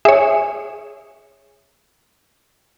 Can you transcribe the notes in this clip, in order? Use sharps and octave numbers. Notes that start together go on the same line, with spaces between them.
G#4 C#5 E5